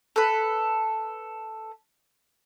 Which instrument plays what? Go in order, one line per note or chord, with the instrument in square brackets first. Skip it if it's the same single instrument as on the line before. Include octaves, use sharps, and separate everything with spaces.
[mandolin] A4 B4